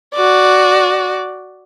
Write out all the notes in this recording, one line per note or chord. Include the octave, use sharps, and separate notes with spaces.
F#4 D5